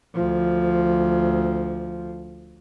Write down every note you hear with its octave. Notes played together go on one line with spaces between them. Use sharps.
D2 F3